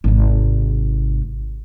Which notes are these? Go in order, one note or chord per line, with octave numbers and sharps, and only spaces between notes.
G#1 C3